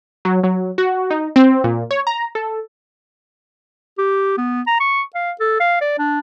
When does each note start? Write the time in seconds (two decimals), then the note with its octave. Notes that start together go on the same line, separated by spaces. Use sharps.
0.25 F#3
0.44 F#3
0.78 F#4
1.10 D#4
1.36 C4
1.64 A#2
1.91 C#5
2.07 A#5
2.35 A4
3.98 G4
4.38 B3
4.67 A#5
4.80 C#6
5.15 F5
5.40 A4
5.60 F5
5.81 D5
5.98 D4